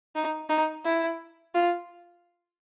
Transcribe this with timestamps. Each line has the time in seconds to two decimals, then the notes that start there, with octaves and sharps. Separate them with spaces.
0.15 D#4
0.49 D#4
0.85 E4
1.54 F4